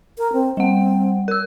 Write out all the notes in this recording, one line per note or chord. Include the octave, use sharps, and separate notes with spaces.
A#4
C4
G3 C4 F#5
A#4 E6